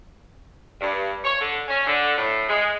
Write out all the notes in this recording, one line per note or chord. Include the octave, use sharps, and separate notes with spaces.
G2
C#5
D3
C#4
D3
A2
G#3